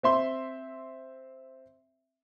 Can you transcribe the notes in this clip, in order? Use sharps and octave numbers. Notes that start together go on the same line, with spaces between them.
C4 E5 C6